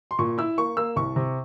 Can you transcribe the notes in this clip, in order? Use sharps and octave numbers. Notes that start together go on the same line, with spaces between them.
C6
A#2 C#6
E4 E6
A#3 C#6
A#3 E6
C2 C#6
C3